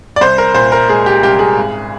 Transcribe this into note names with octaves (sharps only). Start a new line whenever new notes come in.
D5
C2 C5
A#4
A#2 C5
A#4
G#3 G#4
G4
C2 G4
G#4
G#1